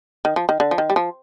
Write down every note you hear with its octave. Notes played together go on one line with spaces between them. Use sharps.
D#3
F3
D#3
D3
F3
D#3
G3
F3